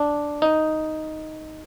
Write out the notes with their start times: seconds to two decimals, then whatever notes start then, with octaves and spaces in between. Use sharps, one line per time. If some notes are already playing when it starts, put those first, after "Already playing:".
Already playing: D4
0.42 D#4